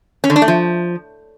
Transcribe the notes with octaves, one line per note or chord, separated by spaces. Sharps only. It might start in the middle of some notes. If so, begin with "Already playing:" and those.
C#4
D3
D4
A3
F3